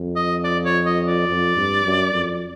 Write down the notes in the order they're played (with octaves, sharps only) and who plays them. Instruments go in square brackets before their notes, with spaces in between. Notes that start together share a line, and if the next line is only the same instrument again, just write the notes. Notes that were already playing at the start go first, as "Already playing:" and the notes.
Already playing: [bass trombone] F2
[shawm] D#5
D5
C#5
D#5
D5
[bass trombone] F2
G2
F#2
F2